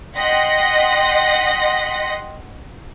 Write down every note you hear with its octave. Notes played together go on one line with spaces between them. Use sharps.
D#5 F#5 G5 C6 A#6 B6